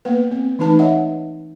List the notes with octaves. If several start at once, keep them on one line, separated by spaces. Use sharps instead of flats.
A#3 B3 B4
C4
E3 A3 D#4 B4 A5
C#5 D#5 E5 F#5